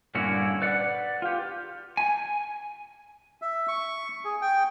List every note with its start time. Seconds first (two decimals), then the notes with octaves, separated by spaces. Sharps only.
0.15 G2 A#2 D3 C#4 E4 F#4
0.62 B4 D5 F#5
1.22 F4 G4
1.97 G#5
3.42 E5
3.68 C#6
4.25 G#4
4.42 G5